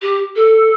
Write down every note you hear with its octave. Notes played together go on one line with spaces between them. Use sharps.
G4
A4